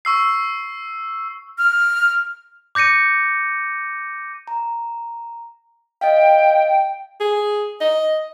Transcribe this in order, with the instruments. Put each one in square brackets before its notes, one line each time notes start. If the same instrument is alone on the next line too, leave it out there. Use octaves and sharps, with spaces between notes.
[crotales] C#6 E6 C7
[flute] F6
[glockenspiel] D6 G6 A#6 C#7 D#7
[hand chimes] A#5
[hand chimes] D#5 F5 [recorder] G5
[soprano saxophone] G#4
D#5